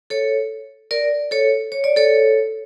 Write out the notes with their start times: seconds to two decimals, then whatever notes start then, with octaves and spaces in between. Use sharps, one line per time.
0.10 A4 C#5
0.91 A#4 D5
1.31 A4 C#5
1.72 C#5
1.84 D5
1.96 A4 C#5